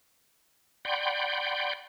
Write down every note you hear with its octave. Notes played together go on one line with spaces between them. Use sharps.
D5 F#5 G5 B5 C6 G6